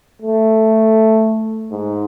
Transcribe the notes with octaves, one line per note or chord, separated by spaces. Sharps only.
A3
G#2